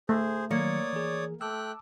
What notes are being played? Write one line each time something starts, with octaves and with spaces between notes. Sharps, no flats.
A3 G#4 C5
D#3 F#3 A#3 C#5 D5 D#6 C#7
E3 G#4
A3 G5 A5 D6 E6 F#6